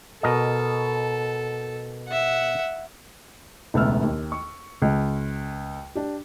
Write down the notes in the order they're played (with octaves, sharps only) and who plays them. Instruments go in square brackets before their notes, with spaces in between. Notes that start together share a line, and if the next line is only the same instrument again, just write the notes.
[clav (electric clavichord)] B2 A#4 D#5 [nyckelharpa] A4
[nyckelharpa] E5 F#5
[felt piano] E1 C#2 A3 B3 E6 F6
D#2
C#6
C#2
D4 G4